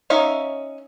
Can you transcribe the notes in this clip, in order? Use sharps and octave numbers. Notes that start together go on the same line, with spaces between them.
C#4 D#4 E5 F5